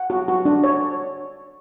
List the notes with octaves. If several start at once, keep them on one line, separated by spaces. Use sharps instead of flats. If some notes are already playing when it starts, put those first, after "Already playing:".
Already playing: F#5
F#4
F#4
D4
C#5